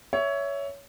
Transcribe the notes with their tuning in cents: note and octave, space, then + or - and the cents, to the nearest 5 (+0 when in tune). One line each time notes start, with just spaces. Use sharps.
C#5 +15 E5 +0